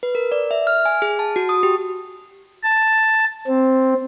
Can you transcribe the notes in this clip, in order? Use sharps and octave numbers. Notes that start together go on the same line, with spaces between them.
B4
A#4
D5
E5
F6
G#5
G#4
A5
F#4
D#6
G4
A5
C4